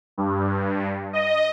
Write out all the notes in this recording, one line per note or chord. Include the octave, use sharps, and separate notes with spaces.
G2
D#5